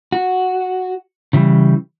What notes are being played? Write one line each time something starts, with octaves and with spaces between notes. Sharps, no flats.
F#4
C#3 E3 G3